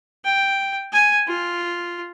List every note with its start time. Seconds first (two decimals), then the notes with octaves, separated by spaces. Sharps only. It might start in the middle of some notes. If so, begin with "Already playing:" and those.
0.25 G5
0.93 G#5
1.27 F4